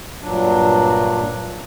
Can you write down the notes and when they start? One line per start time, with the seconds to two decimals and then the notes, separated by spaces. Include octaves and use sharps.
0.21 G2 A#2 F#3 D4